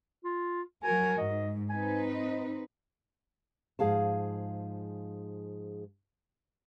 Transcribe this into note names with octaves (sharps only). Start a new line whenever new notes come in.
F4
F#3 F#4 A#4 G#5
G#2 D#5
C4 D#4 B4 G#5
D#5
G#2 F3 F#3 G#4 F5 A5